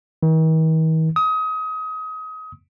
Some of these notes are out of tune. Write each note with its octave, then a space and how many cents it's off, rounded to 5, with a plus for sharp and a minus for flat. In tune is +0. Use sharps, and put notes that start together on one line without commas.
D#3 +45
D#6 +30